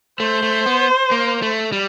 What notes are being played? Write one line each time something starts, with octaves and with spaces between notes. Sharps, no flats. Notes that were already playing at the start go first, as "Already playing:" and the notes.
A3 C5
A3
B3
A#3
A3
G3